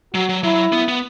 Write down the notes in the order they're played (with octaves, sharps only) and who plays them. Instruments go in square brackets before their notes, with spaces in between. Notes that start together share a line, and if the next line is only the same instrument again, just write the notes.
[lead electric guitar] F#3 [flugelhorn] F#4
[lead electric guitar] F#3
[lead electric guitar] F#3 [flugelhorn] E4
[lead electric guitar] B3
B3